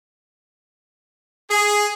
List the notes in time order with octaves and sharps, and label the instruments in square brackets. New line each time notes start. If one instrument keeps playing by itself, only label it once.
[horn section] G#4